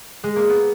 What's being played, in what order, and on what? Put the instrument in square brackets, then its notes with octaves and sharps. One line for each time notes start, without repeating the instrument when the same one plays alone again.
[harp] G#3
A#3
B3